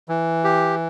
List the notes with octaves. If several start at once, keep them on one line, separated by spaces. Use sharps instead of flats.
E3
G4